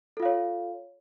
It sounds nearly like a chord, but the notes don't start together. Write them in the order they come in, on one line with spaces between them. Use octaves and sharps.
A4 F4 F5 C#5